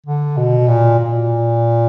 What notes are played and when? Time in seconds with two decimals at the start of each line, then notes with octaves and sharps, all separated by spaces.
0.06 D3
0.37 B2
0.68 A#2
0.98 A#2